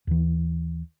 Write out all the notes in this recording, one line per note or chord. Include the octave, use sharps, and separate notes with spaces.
D#2 E3